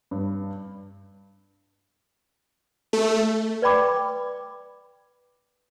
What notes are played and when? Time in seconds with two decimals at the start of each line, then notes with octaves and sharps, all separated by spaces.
0.11 G2
2.93 A3
3.62 B4 D5 G5 B5 D6